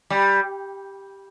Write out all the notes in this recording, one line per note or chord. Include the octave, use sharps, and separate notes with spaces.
G3